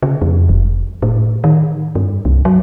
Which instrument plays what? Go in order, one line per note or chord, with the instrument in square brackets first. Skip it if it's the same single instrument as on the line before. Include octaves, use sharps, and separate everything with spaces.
[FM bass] C#3
F2
F1
A2
D#3
G2
C2
F#3